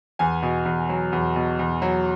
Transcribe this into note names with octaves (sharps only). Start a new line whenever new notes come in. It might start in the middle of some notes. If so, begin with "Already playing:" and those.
E2 G#5
B2
E2
F#3
E2
B2
E2
F#3